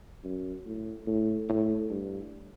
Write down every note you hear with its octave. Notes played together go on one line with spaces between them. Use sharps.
F#2
A2
A2
A2
G2